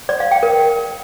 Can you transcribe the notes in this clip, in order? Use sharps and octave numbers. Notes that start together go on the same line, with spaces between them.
D5
F5
G5
A#4